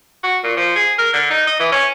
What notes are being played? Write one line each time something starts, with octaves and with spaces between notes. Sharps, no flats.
F#4
A#2
F3
G#4
A#4
D3
D#4
D#5
E3
C#4